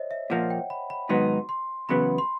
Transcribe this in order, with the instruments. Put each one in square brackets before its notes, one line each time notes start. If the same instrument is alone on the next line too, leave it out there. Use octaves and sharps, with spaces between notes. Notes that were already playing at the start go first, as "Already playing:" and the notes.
Already playing: [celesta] C5 C#5 D#5 E5
E5
[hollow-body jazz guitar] A#2 F3 A#3 [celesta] F#5
[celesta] G5
B5
B5
[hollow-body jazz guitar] G#2 D#3 F#3 B3 D#4 [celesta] C6
[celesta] C6
[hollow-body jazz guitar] E2 C#3 F#3 B3 [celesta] B5
[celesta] C6